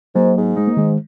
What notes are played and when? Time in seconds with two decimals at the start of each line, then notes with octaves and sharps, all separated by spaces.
0.15 G#2 F#3 A#3
0.37 G#2
0.57 G#3 D#4
0.67 A#3
0.77 G#2 D#3 G#3